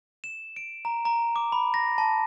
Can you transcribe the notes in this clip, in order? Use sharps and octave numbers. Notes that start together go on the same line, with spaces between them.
E7
D7
A#5
A#5
D6
B5
A#6
A5